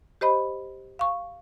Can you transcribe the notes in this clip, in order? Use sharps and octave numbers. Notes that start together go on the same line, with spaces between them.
G4 C5 D#5 B5
F5 C#6